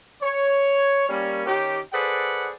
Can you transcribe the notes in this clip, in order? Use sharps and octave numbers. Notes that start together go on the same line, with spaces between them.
C#5
G3 A#3 C#4
D#3 C#4 D#4 G4
G#4 A4 B4 C5 D5 F#5